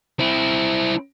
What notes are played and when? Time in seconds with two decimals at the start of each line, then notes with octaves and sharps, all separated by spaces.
0.19 C4 E4